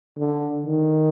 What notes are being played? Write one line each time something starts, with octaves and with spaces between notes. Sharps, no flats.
D3
D#3